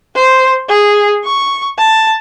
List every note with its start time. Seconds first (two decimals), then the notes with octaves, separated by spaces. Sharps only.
0.15 C5
0.68 G#4
1.24 C#6
1.78 A5